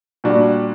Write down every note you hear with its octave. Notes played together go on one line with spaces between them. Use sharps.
A#2 G3 D4 F#4